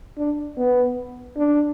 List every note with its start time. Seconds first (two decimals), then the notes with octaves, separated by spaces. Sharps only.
0.18 D4
0.58 B3
1.37 D4